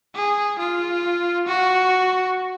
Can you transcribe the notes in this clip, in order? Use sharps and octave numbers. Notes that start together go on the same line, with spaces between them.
G#4
F4
F#4